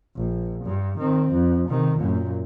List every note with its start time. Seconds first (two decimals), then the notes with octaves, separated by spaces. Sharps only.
0.16 A#1
0.65 G2
0.99 D#3 C4
1.31 F2
1.69 C3 D#3
1.98 F#2 A#2